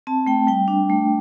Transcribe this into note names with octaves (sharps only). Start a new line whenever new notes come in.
C4 A5
A3 G5
G3 G5
D4
A3